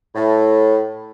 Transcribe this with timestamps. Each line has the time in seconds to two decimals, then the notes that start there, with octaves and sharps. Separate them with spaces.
0.15 A2